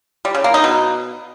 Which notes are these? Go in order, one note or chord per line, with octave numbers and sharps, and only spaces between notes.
G3
C#3
A#3
D#4
B2